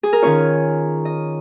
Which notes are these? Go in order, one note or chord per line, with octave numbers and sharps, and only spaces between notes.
G#4
A#4
D#3 C#4 F4 C#5
D#5